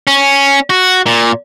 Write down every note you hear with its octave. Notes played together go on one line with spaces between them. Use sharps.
C#4
F#4
A#2